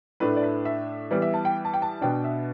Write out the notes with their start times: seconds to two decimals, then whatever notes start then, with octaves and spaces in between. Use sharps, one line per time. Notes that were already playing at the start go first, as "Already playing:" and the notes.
0.20 A2 A3 D4 B4
0.37 D5
0.43 B4
0.65 E5
1.11 E3 G3 B3 D5
1.22 E5
1.34 A5
1.45 G5
1.65 A5
1.74 G5
1.82 A5
2.01 B2 B3 D4 G5
2.24 E5